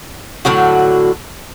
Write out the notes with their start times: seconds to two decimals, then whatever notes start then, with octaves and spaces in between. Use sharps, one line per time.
0.45 A2 D3 F#3 F#4